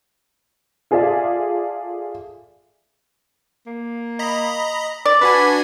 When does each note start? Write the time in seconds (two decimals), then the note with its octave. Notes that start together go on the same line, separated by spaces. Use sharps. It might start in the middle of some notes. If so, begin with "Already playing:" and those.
0.91 F4 G#4 A4 D5 E5 F5
3.67 A#3
4.19 D#5 A#5 B5
5.06 D5
5.21 D4 F#4 B4 G#5